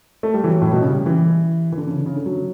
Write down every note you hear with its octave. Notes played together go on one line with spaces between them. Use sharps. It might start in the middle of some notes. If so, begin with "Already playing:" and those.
A3
G3
E3
F#3
A2
B2
C#3
G3
E3
E3
D3
C#3
D3
C#3
D3
F#3